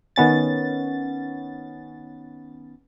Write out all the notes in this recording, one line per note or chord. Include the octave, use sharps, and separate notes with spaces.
D#3 B3 C#4 A6